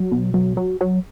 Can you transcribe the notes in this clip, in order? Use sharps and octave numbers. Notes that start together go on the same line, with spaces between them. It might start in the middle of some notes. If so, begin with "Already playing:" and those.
Already playing: F#3
B2
F#3
F#3
F#3